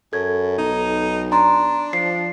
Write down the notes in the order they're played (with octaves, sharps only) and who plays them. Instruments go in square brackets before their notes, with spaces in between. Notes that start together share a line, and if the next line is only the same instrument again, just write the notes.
[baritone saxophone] F#2 [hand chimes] A4 G#6
[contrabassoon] B1 [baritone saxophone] D#4
[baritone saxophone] D4 [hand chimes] A#5 C6
[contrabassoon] F3 [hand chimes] C7